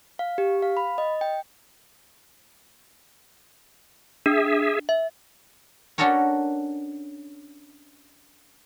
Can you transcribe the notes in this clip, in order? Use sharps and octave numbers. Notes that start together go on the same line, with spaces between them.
F5
G4
F5
B5
D#5
G5
D4 G#4 E5
E5
C#4 D4 F#4 A4 A#4 C#5